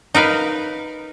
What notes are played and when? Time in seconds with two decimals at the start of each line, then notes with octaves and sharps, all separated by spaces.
0.14 D#4 A#4 B4 F5